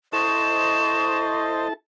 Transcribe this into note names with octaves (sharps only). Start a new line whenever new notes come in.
E4 A4 C5 D#5 A5 C#6 E7